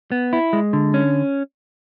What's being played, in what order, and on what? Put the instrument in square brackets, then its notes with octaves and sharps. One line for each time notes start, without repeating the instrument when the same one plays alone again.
[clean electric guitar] B3
E4
G#3
D3
C#4